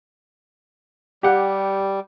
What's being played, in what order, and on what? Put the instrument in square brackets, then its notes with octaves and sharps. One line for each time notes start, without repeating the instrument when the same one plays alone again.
[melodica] G3 [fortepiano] G4 F#5